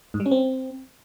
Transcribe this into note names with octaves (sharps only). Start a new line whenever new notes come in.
G#2
G3
C#4
C4